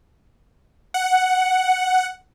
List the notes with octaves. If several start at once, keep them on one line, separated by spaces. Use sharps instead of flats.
F#5